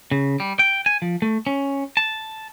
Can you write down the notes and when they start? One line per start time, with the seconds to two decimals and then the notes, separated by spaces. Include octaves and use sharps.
0.12 C#3
0.40 G3
0.59 G5
0.86 G#5
1.02 F3
1.22 A3
1.47 C#4
1.97 A5